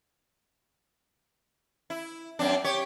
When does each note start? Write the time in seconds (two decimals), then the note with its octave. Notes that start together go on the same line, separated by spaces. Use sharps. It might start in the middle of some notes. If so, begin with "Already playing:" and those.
1.90 E4
2.39 F#2 C4 D4
2.64 G4 C#5